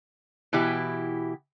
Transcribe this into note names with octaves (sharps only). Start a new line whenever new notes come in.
B2 E3 E4 G4